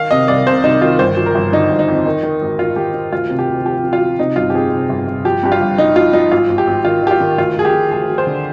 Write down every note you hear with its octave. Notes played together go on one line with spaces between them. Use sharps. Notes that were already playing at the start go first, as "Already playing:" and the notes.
Already playing: D#3 F5
C3 D#5
C2 D5
C3 C5
C2 D#4
D#3 F4
G1 C5
F3
A#4
G1
D3 D#4
G1
D#4
F2
D#3
D#3
G#1
G#1 F4
D#3 G4
D#3
D2 F4
C3
G4
D2
F3 G4
F3
F4
F3
C3 D#4
G1 F4
G4
F2 G#4
C3
G1
G1
F3 G4
G2 G4
F4
G1
G1 D#4
F3 F4
F3 D#4
G#1 F4
G#1
G4
G#1
D#3 F4
D#3 G4
F4
D#3
D2 F4
D2 G#4
G4
F3
D2 G#4
F3
C5
D3